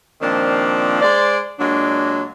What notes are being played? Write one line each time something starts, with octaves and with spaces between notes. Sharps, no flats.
A#2 D#3 F3 C4 D4
G#3 C5 D5
A#2 F#3 G#3 D4